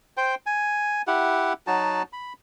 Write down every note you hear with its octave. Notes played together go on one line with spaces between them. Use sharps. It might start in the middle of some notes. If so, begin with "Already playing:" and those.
C5 G5
G#5
E4 G4 F#5
F#3 D#4 F#4 A5
B5